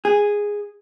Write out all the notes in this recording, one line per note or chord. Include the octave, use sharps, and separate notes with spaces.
G#4